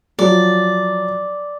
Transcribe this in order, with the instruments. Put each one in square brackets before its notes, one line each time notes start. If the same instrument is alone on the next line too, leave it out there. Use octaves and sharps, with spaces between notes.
[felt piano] F3 F#3 [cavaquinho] D5